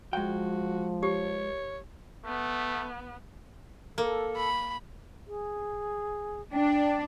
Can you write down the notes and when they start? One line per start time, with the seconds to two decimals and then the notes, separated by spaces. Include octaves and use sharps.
0.13 F3 G#3 F#4 G5
1.03 G4 C#5
2.25 A3 B3
3.98 A#3 A4
4.36 B5
5.27 G#4
6.53 D4 G5